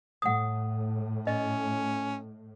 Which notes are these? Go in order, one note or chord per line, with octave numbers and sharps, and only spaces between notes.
A2 F#5 D#6
C#4 D#5